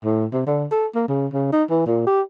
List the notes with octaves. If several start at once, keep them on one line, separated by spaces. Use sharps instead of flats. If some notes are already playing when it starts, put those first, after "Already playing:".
A2
C3
D3
A4
A#3
C#3
C#3
D#4
E3
A#2
G4